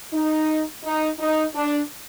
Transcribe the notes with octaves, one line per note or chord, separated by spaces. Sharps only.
D#4
D#4
D#4
D4